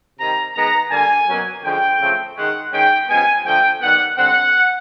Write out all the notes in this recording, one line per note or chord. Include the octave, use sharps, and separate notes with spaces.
C3 D#3 G3 A#5
D#3 G#3 B3 A#5
D3 G3 A#3 G#5
B2 F#3 A#3 C#4
D3 F3 G#3 C#4 G5
C#3 F3 A3 C4
D#3 G#3 C#4 F#5
D#3 G#3 C#4 G5
C#3 F3 G#3 B3 G#5
D3 F3 A3 G5
D#3 G3 B3 F#5
D3 G3 C4 F#5